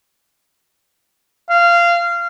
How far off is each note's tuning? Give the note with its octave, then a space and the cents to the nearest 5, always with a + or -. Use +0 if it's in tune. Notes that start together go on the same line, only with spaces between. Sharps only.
F5 -20